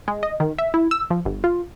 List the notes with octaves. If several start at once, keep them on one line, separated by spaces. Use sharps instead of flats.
G#3
D#5
D#3
E5
E4
E6
F3
G1
F4